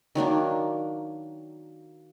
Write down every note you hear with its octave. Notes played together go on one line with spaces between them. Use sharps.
D#3 F#3 A#3 D4